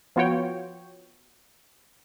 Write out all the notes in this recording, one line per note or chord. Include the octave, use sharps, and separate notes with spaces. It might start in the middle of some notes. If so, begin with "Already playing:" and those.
F3 B3 F4 F#4 C#5 G5